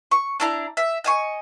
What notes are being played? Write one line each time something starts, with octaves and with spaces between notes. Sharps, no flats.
C#6
D4 E4 A#5
E5
D#5 G#5 C#6